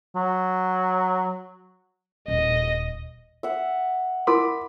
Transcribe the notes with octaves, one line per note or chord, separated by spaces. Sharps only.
F#3
D#1 D#5
E5 F#5
E4 A#4 B5 C6 D6